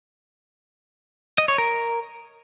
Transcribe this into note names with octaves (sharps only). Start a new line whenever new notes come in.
D#5
C#5
A#4